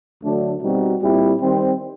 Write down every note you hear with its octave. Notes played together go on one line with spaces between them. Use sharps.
D2 D3 F#3 A3 D4
B2 G3 C4 D#4 F#4
A#2 G3 C4 E4 G4
D#3 G3 C4